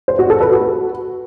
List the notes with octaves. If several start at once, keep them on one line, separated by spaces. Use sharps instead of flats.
C5
F#4
A4
B4
F#4